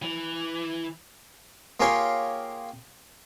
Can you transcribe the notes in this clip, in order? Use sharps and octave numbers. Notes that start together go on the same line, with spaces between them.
E3
A#3 F4 G4 G#4 C#5 F5